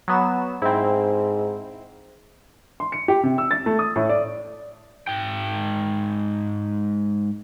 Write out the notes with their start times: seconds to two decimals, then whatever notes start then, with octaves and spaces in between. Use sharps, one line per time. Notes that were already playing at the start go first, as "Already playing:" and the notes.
0.08 F#3 B3 E7
0.62 G#2 C4 E4
2.80 C6
2.92 C#7
3.08 G4
3.23 C3
3.38 E6
3.51 A6
3.66 A3
3.79 D#6
3.96 A2
4.09 D5
5.08 G#2 G5